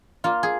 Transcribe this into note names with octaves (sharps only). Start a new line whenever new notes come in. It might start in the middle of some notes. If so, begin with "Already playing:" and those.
A#3 F4
G#4